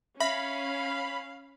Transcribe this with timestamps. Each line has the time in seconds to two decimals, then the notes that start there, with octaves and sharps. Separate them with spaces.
0.20 C#4 E5 F5 B5